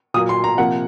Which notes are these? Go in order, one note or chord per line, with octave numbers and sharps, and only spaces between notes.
A#2 F#3 A#3 D#6
C6
A#5
C3 F3 A#3 F#5